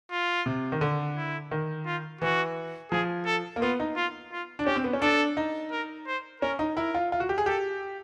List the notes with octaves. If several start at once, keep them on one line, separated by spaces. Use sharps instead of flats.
F4
C3
D#3
D3
E4
D#3
F4
E3 F#4
F3 G#4
A4
A#3
B3 F4
D#4
F4
F4
D4
C#4 G4
C4
B3
C#4
D4 A4
D#4
A#4
C5
C#4 A#4
D#4
E4 A#4
F4
F4
F#4
G4
G#4
G4 A4